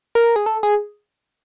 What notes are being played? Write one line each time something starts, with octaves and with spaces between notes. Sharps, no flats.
A#4
G#4
A4
G#4